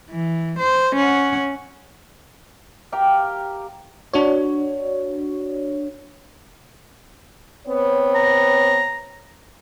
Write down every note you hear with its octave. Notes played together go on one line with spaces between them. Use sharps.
E3
C5
C#4 F#5
G4 A#4 F5 G5
D4 F#4 C#5
B3 C4 C#5
A#5